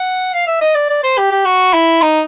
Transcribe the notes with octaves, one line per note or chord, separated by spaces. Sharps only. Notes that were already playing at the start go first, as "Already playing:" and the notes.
Already playing: F#5
F5
E5
D#5
D5
D5
C5
G4
G4
F#4
E4
D#4